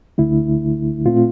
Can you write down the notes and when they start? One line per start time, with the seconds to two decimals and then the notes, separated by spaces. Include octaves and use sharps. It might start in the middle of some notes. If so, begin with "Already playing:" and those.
0.18 D2 D3 A3 D4 E4
1.06 A#2 A3 C4 F4